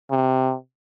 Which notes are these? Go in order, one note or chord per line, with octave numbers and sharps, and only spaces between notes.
C3